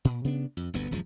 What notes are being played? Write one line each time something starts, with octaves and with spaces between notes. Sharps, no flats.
A#2
C3 B3 D4
F2
G1 D2 B3
D#1 F#2 F3 G#3